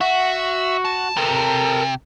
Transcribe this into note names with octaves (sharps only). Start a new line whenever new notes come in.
F#4 E5
A5
C3 A4 A#4